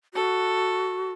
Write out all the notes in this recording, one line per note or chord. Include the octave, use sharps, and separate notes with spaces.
F#4 A4